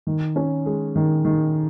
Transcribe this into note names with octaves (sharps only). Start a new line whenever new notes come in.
D#3
C#4
G#3
D#3
D#3